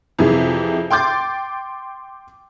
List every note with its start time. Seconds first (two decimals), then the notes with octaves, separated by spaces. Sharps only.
0.19 F2 C3 E3 G#4
0.90 G5 C6 D6 G6 A6